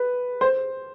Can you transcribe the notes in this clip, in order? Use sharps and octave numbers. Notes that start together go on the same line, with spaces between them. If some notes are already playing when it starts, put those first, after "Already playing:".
Already playing: B4
C5